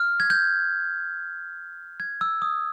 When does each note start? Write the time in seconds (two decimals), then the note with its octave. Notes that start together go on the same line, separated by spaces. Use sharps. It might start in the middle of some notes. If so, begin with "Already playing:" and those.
Already playing: F6
0.20 G#6
0.30 G6
2.00 G#6
2.21 E6
2.42 D#6